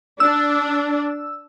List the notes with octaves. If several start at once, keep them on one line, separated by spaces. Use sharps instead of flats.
D4 E6